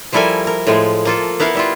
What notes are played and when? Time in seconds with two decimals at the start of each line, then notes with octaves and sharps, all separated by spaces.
0.12 F3 G3 E4 A4 A#4 G#5
0.47 A#4
0.67 A2 F3 G#3
1.05 A#3 F4 A4
1.40 B3 E4 A#4 F5 F#5
1.55 G3 E4 F4